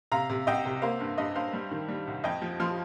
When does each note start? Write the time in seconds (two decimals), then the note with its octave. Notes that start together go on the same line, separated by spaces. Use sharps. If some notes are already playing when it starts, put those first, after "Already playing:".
0.12 C3 F5 A#5
0.30 C3
0.47 C2 D#5 G5
0.65 C3
0.82 A#3 C5 F5
1.01 G2
1.18 G2 D#5
1.36 G2 C5 F5
1.53 G3
1.71 D#3
1.89 G3
2.07 C2
2.24 F2 D#5 G5
2.42 F3
2.60 F3 C6 F6